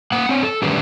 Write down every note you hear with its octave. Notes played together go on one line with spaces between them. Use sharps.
A#3 F#5
C4 C#5
A4
D3 D#3 G3 A3 C#4 B4